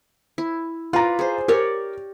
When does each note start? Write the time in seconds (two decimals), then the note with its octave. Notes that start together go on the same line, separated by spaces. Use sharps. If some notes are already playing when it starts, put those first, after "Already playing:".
0.38 E4
0.93 F4 B4 D5 A#5
1.19 G#4 C5
1.48 G4 A#4 C#5 D5